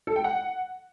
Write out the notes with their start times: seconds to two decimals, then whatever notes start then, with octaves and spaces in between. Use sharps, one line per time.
0.07 A4
0.16 G5
0.24 F#5